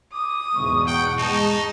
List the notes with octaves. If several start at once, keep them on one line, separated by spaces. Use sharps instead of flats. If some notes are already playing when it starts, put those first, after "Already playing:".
D6 D#6
E2 G#2 B2 C#6
F#5 G5 C#6
G#3 D#4 A5